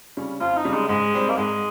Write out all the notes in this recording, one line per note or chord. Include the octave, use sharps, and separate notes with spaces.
C#3 G3 C#4
F2 F4
D#4
C#3 G3 C#4
G#3
G#2 G#3
G3 C4 G4
A#3
G#2 G#3